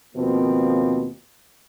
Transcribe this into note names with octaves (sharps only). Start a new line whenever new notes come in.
D#2 B2 F3 A#3 C4